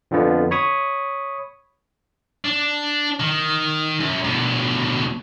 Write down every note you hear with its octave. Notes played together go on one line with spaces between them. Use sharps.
F2 D3 F3 B3
C#5 B5 C#6 D#6
D4
D#3
F#2
D2 B2